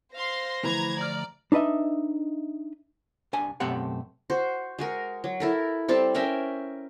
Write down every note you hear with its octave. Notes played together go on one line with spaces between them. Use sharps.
C5 F5 C6 A#6
D3 E3 F3 A3 A#5 B5 G#6
D5 A#5 F6
D4 D#4 B4 D#5 E5
C2 D4 G#5
F#2 B2 A3 C4 G4 F#5
F#4 C5
G#3 F#4 A#4
F#3
E4 A4 A#4
G3 C4 A4 A5
C#4 A#4 E5 G5